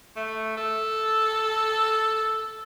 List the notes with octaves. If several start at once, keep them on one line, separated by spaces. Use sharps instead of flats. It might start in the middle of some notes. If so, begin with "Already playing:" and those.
A3
A4